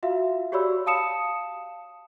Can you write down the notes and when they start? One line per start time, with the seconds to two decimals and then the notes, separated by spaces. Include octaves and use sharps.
0.03 F4 F#4 E5 F5
0.52 F#4 G4 C#5 D5 B5 E6
0.86 F5 A5 D#6 C#7 E7